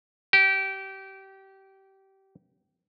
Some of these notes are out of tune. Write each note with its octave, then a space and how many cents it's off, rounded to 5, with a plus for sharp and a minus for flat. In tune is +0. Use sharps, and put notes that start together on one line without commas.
G4 -25